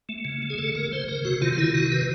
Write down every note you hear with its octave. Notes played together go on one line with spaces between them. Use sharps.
A3
C#3
A3
G#4
C#3 A4
C#3 A#4
C#3 C5
C#3 A#4
C3 F#4
D#3 F4
F4
D#3 E4
C3 F#4
D#3 B4